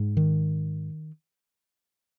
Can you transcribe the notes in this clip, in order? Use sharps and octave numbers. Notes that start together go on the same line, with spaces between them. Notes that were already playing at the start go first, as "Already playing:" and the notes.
Already playing: G#2
D#3